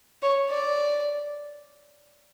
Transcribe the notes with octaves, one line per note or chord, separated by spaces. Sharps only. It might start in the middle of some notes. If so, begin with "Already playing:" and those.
C#5
D5